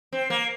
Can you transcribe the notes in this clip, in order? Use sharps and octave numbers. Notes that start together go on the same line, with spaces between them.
C4
A#3